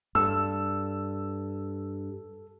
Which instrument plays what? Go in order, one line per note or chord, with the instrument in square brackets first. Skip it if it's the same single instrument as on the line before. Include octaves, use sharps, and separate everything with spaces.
[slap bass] G2 [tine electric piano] A4 [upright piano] E6